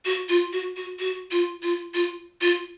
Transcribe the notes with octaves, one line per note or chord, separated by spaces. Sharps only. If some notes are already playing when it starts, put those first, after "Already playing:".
F#4
F4
F#4
F#4
F#4
F4
F4
F4
F4